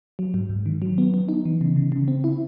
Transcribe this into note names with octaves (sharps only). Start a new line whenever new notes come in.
F#3
G#2
G#2
D#3
F#3
B3
B3
D#4
E3
C#3
C#3
C#3
C4
E4